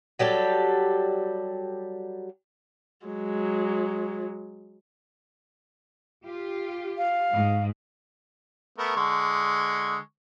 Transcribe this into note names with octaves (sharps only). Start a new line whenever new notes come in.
F#3 G3 G4 A4
F#3 G#3
F4 G4
F5
G#2
A3 B3 A#4
D3 G#3 C#6